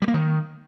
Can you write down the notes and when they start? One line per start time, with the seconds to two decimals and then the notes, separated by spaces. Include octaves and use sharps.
0.02 G3
0.08 A#3
0.14 D#3